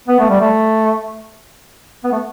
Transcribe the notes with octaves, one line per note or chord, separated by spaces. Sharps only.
B3
A3
G3
A3
B3
A3